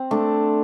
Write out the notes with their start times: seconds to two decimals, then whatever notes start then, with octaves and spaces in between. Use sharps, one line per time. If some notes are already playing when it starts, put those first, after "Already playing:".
Already playing: C4
0.11 A3 D4